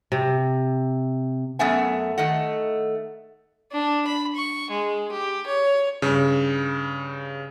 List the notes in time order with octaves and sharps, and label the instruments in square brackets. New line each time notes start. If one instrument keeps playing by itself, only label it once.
[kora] C3
[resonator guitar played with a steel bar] F#2 A3 B3 E5 F#5 G#5
D#3 A3 D#5 F#5
[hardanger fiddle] D4
B5
C#6
G#3
G4
C#5
[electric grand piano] G2 C#3